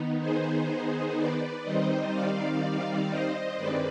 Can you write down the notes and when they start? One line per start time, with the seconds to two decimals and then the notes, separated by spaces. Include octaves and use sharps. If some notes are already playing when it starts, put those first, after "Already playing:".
Already playing: D#3 B3 D#4
0.20 G#4 C5
1.16 B4 D5
1.64 D#3 G3 C4 D#4 C5 D#5
2.13 D5 F5
3.09 C5 D#5
3.57 G2 D#3 G#3 C4 B4 D5